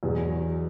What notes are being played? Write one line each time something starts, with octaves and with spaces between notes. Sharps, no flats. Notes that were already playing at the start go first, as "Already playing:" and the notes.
E2 B2 F#3 G#4